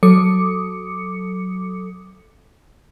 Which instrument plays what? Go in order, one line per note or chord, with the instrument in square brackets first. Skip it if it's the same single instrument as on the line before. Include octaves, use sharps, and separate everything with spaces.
[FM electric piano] F#3 A4 D6 D#6 C#7